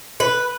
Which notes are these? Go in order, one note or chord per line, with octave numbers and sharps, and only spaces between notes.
B4